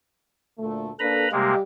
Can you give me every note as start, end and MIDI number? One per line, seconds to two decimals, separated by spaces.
0.59 0.91 38
0.59 0.91 46
0.59 0.91 57
0.99 1.26 58
0.99 1.26 62
0.99 1.26 69
0.99 1.28 71
0.99 1.28 82
0.99 1.28 83
1.32 1.54 48
1.32 1.62 55
1.32 1.54 56
1.32 1.54 58
1.32 1.62 67